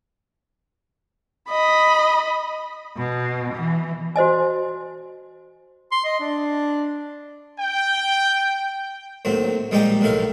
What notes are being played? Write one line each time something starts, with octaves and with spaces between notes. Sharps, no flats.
D#5 B5
B2
E3
F#4 C5 D#5 G#5
C6
D#5
D4
G5
D#2 A2 F#3 C4
A#1 G3 G#3 D#4 G4 G5
B1 A2 D#3 E4 F5